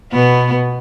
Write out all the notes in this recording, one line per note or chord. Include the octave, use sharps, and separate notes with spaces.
B2 B3